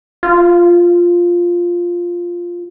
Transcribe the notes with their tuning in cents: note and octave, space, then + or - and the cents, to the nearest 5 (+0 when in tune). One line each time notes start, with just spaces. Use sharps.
F4 +0